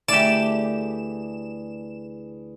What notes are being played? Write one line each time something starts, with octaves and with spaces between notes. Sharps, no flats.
D2 E3 G4 G#4 D5 E7